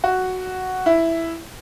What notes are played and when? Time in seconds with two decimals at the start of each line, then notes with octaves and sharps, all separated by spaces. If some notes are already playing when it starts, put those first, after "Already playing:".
0.04 F#4
0.86 E4